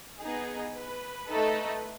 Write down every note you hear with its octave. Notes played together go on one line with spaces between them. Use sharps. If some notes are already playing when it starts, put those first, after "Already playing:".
B3 D#4 G#4
B4
A3 D#4 A4